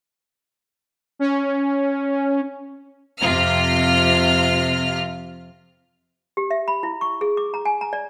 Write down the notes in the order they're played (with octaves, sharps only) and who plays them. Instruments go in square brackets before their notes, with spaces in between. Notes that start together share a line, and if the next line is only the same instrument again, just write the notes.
[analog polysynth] C#4
[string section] F2 C3 F4 F6
[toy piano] G4
E5
B5
E4
C#6
G#4
D6
A#5
G#5
A#5
D5